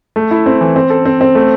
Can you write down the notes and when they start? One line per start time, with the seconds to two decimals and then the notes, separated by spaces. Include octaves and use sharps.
0.16 A3
0.31 E4
0.46 C4
0.61 E3
0.76 C4
0.90 A4
1.05 C4
1.21 C4
1.35 A3